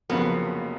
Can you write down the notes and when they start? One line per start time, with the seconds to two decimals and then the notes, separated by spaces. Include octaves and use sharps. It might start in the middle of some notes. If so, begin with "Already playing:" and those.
0.10 F1 F2 C#3 F#3 A#3 B3